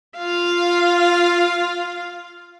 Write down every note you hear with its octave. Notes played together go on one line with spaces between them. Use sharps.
F4 F5